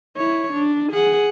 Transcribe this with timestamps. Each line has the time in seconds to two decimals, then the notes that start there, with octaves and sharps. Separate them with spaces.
0.17 E4 C#5
0.53 D4
0.92 G#4 F#5